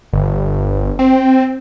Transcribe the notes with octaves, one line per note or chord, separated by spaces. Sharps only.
G1
C4